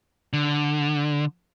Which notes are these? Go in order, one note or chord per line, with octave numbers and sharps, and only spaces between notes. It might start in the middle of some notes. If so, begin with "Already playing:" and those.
D3